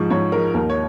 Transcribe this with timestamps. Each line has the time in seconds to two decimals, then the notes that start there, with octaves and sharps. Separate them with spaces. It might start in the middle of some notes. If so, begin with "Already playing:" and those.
Already playing: G#2 F3 G#3 C#6
0.10 G#2 C#5
0.32 F3 G#3 A#4
0.54 D#2 A#4
0.69 C#5